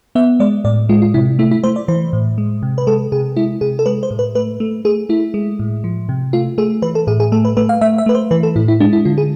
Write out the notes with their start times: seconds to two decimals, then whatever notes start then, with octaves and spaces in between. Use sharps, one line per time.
0.15 B3 E5
0.40 G#3 D5
0.65 A2 D5
0.89 G#3 F4
1.02 F4
1.14 C3 E4
1.39 A3 E4
1.51 E4
1.64 A3 C5
1.76 D5
1.88 E3 C5
2.13 A2
2.38 G#3
2.63 C3
2.78 B4
2.87 G#3 A4
3.12 C3 G#4
3.36 G#3 E4
3.61 C3 G#4
3.79 A4
3.86 G#3 B4
4.03 C5
4.11 A2
4.19 B4
4.35 A3 B4
4.60 A3
4.85 A3 G#4
5.09 A3 E4
5.34 G#3
5.59 A2
5.84 F3
6.09 C3
6.33 A3 F4
6.58 A3 G#4
6.82 E3 B4
6.95 A4
7.07 A2 G#4
7.20 G#4
7.32 A3 A4
7.45 B4
7.57 A3 B4
7.69 F5
7.81 A3 E5
7.98 E5
8.06 A3 B4
8.15 C5
8.31 E3 B4
8.43 A4
8.56 A2 E4
8.68 E4
8.80 G#3 D4
8.93 E4
9.05 D3 F4
9.18 G#4